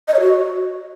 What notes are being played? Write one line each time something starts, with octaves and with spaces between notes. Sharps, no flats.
D#5
C#5
F#4